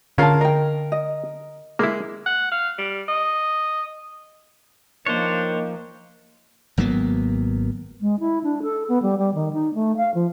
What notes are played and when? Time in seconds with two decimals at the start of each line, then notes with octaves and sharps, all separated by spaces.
0.18 D3 C#4 F4 G#4 A#4 F5 A5
0.41 A#4 D#5 G5
0.92 D#5
1.79 G#3 A#3 E4
2.26 F#5
2.52 F5
2.78 G3
3.08 D#5
5.06 D#3 F3 A#3 D4 C5 C#5
6.78 G#1 F#3 A#3 B3
8.01 G#3
8.20 E4
8.44 D4
8.63 A4
8.89 B3
9.02 G3
9.18 G3
9.34 D#3
9.53 D#4
9.74 A3
9.97 F5
10.15 F3